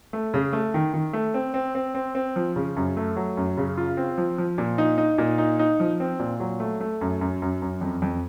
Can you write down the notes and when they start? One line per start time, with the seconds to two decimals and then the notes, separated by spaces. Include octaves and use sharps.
0.13 A3
0.34 C#3
0.53 A3
0.74 D#3
0.94 D#3
1.13 A3
1.34 C4
1.54 C4
1.75 C4
1.95 C4
2.15 C4
2.36 F3
2.56 C#3
2.76 F#2
2.97 A3
3.16 F#3
3.37 F#2
3.57 C#3
3.78 F4
3.97 C4
4.18 F3
4.38 F3
4.58 A#2
4.78 D#4
4.98 D#4
5.18 A#2
5.38 D#4
5.59 D#4
5.80 F3
6.00 C4
6.19 A#2
6.40 F#3
6.60 A3
6.80 A3
7.01 F#2
7.21 F#2
7.42 F#2
7.62 F#2
7.81 F2
8.02 F2